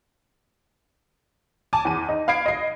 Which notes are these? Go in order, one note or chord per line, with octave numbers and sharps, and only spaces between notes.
G#5 A5 D6
E2 D#7
D#4
F5 B5 G#6 C7 D7
D#5 C7